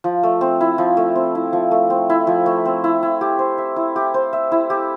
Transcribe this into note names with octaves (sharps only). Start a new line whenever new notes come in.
F3
A3
C4
E4
F3
A3
C4
E4
F3
A3
C4
E4
F3
A3
C4
E4
E4
G4
C5
E5
E4
G4
C5
E5
E4
G4